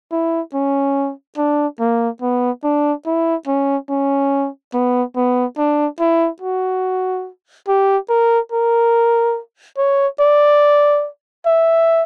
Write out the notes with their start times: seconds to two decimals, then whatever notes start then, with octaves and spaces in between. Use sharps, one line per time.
0.12 E4
0.54 C#4
1.37 D4
1.80 A#3
2.22 B3
2.64 D4
3.06 E4
3.47 C#4
3.89 C#4
4.74 B3
5.16 B3
5.58 D4
6.00 E4
6.42 F#4
7.68 G4
8.10 A#4
8.52 A#4
9.78 C#5
10.20 D5
11.46 E5